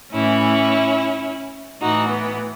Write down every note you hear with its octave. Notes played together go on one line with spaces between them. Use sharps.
A2 E3 C#4 E4
A2 E3 D#4 F#4
B3